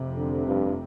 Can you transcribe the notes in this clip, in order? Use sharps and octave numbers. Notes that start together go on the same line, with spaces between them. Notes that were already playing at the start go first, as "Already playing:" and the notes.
Already playing: F1 F2 C3
D3
G2